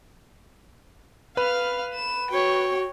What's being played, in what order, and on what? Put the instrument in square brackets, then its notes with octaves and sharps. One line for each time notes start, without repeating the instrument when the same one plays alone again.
[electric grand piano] B4 B5 [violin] F5 F6
[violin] E7
[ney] F#4 [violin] C#5 G5